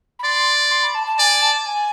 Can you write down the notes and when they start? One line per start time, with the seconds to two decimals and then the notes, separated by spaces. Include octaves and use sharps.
0.19 B5
0.24 D5 C6
0.71 C6
0.83 B5
0.95 A5
1.07 A5
1.19 D5 G#5
1.42 A5
1.66 G#5